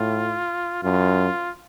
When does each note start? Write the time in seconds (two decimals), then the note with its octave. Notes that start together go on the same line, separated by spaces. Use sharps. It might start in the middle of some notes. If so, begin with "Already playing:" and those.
Already playing: A2 F4
0.83 F#2 F4